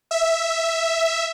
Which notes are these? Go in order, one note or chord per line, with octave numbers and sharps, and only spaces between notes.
E5